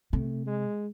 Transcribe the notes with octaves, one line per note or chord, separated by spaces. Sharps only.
C3 A3
G#3